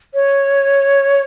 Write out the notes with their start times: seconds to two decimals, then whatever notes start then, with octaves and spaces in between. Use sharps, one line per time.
0.14 C#5